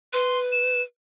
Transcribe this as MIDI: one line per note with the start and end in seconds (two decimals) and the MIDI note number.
0.13 0.82 71
0.13 0.38 84
0.52 0.82 100